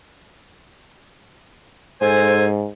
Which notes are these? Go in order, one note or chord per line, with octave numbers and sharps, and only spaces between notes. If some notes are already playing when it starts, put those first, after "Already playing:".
G#2 A4 C5 G#5